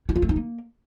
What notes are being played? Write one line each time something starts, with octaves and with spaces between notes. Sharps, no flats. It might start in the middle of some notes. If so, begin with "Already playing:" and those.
E4
F4
A3
D#4
A#3